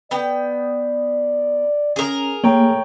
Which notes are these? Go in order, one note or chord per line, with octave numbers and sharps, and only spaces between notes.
B3 D5 G5
C#4 G#4 A#4
A3 A#3 C#5 G5 A#5